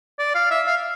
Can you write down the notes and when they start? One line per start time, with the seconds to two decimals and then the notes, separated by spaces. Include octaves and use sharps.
0.19 D5
0.35 F5
0.51 E5
0.67 F5